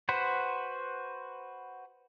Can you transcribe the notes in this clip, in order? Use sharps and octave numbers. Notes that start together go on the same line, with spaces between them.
F#4 B4 C5 F#5